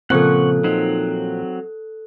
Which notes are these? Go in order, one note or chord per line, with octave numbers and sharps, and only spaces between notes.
A#2 C#3 F3 C4 A4 F#5 C#6 F#6
F#3 C4 D#4